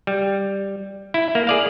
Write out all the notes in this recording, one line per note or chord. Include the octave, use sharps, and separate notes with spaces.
G3
E4
A#3
G#4 D5 F5